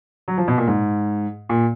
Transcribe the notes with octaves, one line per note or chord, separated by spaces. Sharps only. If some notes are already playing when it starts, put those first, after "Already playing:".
F#3
F3
B2
A#2
G#2
A#2